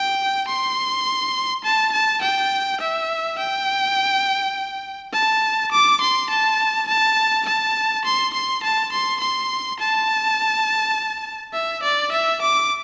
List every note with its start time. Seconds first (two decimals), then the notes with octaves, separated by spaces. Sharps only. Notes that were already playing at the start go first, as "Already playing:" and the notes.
Already playing: G5
0.48 C6
1.64 A5
1.93 A5
2.22 G5
2.81 E5
3.39 G5
5.13 A5
5.72 D6
6.01 C6
6.30 A5
6.88 A5
7.46 A5
8.05 C6
8.34 C6
8.63 A5
8.92 C6
9.21 C6
9.80 A5
11.53 E5
11.83 D5
12.12 E5
12.42 D6